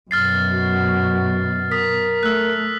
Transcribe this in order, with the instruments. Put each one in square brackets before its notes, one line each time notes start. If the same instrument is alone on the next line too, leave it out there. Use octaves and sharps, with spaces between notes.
[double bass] F#2 B2 [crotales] F6 A6 C7
[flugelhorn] F#4
[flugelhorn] A#4 [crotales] D#6 B6
[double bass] A3 [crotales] E6 F#6